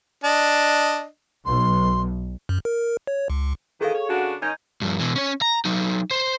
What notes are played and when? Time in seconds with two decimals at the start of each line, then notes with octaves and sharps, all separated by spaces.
0.24 D4 D#5
1.46 B1 C6
2.49 F#2
2.65 A#4
3.07 C#5
3.30 C#2
3.81 D#3 E3 G#4 A4 F5
3.94 C#5
4.09 C#3 D4 F#4
4.42 D#3 C#4 D#4 G6 G#6
4.82 G2 F3
4.99 B2 E3
5.16 C#4 C#5
5.42 A#5
5.65 F#3 D#4
6.11 C5